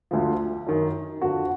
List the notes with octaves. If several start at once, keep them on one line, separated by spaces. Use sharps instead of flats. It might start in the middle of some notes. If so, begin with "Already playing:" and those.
D2 D3 F3
F#2 D#3
F2 D3 F3 F#4